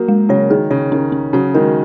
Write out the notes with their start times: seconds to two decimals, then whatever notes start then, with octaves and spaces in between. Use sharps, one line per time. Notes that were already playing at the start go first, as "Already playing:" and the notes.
Already playing: F#3 A#3 F#4 A#4
0.09 G#3
0.29 C#3 F#3 C#5
0.50 D#3 G#4
0.71 C#3 C#5
0.92 D#3 C#4
1.12 C#4
1.33 C#3 F#3 F#4
1.54 D#3 G#3 A#4